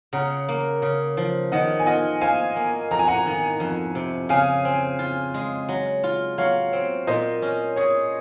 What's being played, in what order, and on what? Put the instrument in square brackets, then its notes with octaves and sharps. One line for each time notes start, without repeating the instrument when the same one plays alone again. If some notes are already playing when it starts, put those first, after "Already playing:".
[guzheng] C#3 [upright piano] F#5 A#5
[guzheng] A#3
C#3
F3
[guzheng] D#3 [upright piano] D#5 F#5
[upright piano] G#5
[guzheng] F4 [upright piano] D#5 F#5
[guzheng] C5 [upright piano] F5 G#5
[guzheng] A#3
[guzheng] F2 [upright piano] A#5
[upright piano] G#5
F#5 A#5
[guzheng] D#3
F2
C3
[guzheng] C#3 [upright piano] F5 G#5
[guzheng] C4
F4
G#3
F#3
F4
[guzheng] F#3 [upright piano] C#5 F5
[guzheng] C4
[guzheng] A#2 [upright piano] C5 D#5
[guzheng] C#4
[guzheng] G#4 [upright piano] C#5